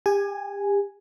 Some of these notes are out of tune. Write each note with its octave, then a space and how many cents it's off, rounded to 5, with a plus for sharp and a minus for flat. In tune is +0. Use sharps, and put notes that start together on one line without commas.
G4 +35 G#5 +0